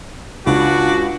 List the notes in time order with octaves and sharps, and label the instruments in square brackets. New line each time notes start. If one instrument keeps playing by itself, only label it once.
[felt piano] C#2 [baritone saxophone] D4 [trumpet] F#4